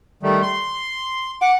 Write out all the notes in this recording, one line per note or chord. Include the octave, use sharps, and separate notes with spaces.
D#3 G3 A3
C6
F#5 D6